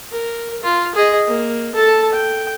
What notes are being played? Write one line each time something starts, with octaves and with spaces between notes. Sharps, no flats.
A#4
F4
G#4 D#5
A#3
A4 A5
G5